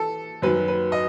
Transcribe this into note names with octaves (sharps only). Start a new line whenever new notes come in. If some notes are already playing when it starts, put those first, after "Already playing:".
Already playing: E3 A4
F#2 D#3 F#3 B4
B4
D#5